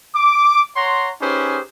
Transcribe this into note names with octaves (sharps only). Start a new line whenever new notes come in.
D6
C#5 F#5 A#5 C6
C#4 D#4 G4 G#4 B4 C5